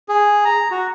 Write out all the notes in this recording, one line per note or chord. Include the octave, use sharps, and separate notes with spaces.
G#4
A#5
F#4